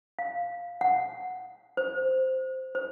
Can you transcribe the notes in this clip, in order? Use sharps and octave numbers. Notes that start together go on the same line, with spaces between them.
F5
F#5
C5
C5